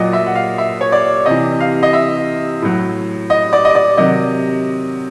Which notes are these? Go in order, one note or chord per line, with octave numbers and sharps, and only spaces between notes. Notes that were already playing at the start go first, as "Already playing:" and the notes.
Already playing: A#2 F#3 D#5
E5
F#5
F5
E5
C#5
D5
C3 E3 D#5
F5
D#5
E5
A2 F#3
D#5
D5
D#5
D5
C3 D#3 F#3 D#5